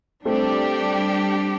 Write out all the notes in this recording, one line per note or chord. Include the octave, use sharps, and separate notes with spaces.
G3 A3 C4 D4 G4